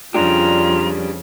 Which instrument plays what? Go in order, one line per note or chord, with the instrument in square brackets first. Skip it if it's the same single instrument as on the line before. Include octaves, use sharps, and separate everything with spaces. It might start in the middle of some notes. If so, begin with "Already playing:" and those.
[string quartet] F2 C#3 [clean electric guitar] G3 D4 G4 [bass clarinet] F4 [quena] A#5